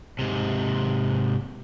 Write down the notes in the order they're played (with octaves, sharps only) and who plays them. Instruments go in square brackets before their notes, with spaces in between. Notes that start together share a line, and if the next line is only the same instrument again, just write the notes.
[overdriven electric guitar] G#2 C3